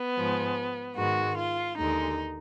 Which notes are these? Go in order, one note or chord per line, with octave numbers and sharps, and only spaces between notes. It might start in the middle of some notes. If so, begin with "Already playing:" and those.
Already playing: B3
G#2 F3 G#3
G#2 D#3 G#3 F#4
F4
D#2 D3 G#3 D#4